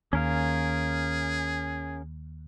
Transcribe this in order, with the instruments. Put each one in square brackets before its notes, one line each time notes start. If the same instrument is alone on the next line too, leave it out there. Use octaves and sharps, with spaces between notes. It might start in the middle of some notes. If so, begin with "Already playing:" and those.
[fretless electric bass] D#2 [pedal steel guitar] C#4 A#4 F5 [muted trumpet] G#4